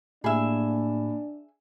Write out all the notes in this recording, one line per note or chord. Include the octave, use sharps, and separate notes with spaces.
A2 A#3 D4 G4 G#4 E5 B5